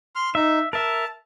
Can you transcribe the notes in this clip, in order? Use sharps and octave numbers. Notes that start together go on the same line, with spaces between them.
C6 F6
D#4 E5
A#4 E5 A5